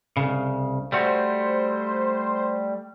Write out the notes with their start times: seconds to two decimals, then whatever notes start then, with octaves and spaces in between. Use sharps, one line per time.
0.17 C2 C#3
0.92 G3 A3 F#4 C5